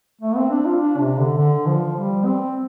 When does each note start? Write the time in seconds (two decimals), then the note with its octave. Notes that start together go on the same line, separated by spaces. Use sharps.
0.21 A3
0.36 C4
0.51 D4
0.66 F4
0.80 D4
0.99 C3
1.18 D3
1.37 D3
1.67 F3
1.96 G3
2.25 C4